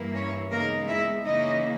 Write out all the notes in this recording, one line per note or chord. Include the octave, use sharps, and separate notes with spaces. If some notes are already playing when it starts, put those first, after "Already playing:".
Already playing: G2 E3 A#3 E4
C#4 C#5
C#3 G#3 A#3 B3 D#4 A#4
E4 E5
C#3 E3 A#3 C#4 D#4 E4 D#5